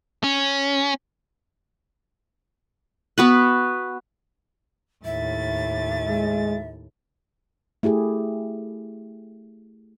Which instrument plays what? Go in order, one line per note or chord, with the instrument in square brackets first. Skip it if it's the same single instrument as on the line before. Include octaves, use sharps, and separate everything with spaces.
[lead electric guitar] C#4
[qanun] B3 F#4 B4
[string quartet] D#2 A2 A6 [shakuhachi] E5
[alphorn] G#3
[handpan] A3 E4 G4 G#4